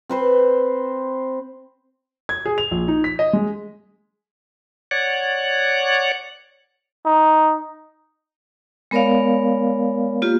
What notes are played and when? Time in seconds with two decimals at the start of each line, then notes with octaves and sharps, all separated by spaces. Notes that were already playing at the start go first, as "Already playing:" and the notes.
0.09 C4 B4 C5
2.29 G#6
2.46 G#4
2.58 F7
2.71 A#1
2.88 D#4
3.04 B6
3.19 D#5
3.33 G#3
4.91 C#5 D5 F#5
7.05 D#4
8.91 G#3 B3 A#4 C#5 D5 F5
10.22 A#3 F4 G4